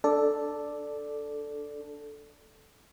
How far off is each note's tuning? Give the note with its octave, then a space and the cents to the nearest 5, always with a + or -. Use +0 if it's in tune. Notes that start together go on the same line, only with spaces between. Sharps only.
D4 +0 A4 +0 D5 +0